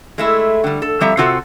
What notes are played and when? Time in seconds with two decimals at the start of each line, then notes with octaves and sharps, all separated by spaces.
0.18 G#3 A3 E4
0.64 D3 G3
0.82 A4
1.01 F2 G3 E5 A#5
1.17 C3 C4 F4 F#4 G#4 A4